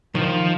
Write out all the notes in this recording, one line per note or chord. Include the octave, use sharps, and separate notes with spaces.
D#3 F3